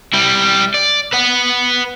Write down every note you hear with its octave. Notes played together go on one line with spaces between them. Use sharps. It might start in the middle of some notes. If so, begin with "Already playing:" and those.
G3 E4
D5
B4 F#5